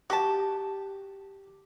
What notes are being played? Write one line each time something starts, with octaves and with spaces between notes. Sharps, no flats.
F#4 G4 A5